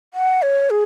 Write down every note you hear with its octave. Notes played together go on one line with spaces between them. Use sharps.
F#5
C#5
G#4